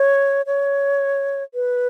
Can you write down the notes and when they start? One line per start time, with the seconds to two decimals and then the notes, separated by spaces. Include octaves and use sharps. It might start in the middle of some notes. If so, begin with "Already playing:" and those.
Already playing: C#5
0.46 C#5
1.54 B4